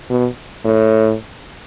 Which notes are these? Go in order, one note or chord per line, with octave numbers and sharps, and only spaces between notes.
B2
A2